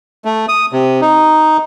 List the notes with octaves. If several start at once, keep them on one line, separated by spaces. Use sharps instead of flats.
A3
D#6
C3
D#4